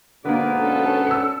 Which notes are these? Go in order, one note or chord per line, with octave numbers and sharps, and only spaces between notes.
G#2 B2 D3 A#3 B3 D5
C#4 D4 A4
E6 C#7